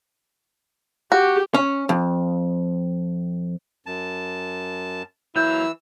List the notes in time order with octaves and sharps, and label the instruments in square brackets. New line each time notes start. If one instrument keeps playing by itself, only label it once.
[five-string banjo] F#4 [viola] G4
[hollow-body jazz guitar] C#4
F2
[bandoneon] F#2 A5
[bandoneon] E3 E6 [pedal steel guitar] F#3 A#3 G6 [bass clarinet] E4